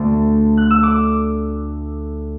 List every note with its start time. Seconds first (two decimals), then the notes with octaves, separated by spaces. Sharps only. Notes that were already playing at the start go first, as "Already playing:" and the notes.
Already playing: D2 D3 A3
0.57 F#6
0.71 E6
0.83 D6